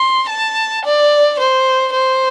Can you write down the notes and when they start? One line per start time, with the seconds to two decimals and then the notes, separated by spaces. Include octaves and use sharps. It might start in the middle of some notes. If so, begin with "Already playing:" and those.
Already playing: C6
0.30 A5
0.85 D5
1.39 C5
1.93 C5